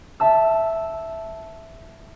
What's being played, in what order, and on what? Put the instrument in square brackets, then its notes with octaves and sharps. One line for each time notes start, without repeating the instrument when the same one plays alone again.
[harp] E5 A5 E6